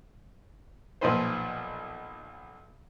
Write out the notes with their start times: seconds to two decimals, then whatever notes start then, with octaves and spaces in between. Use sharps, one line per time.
1.01 B1 A#2 F3 D#4 B4 C5